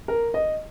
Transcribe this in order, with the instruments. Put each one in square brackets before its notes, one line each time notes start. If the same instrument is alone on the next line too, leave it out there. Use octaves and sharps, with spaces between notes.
[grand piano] A#4
D#5